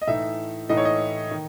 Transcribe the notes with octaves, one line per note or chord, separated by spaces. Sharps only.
D#5
A2 E3 A3 D#4 E5
A2 E3 A3 D#4 D#5
C#5
D#5
D#3